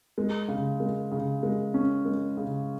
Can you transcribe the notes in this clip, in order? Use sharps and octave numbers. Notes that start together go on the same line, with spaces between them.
G#3
C#3
G#3
C#3
G#3
C#4
G#3
C#3